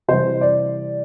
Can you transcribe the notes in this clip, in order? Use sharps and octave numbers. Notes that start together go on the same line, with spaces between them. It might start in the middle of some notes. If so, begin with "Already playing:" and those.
C3 E3 G3 C5
D5